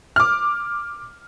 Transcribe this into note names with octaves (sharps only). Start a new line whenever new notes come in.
D6 F6